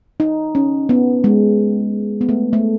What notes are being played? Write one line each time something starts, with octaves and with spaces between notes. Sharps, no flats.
D#4
C#4
B3
G#3
B3
A3
A3